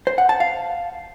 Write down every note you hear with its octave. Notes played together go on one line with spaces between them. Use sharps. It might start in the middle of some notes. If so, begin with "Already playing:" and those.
C5
F#5
A5
F5